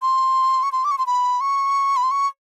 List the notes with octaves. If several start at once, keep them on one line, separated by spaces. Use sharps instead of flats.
C6
C#6
C6
D6
C#6
C6
B5
C#6
B5
C6
C#6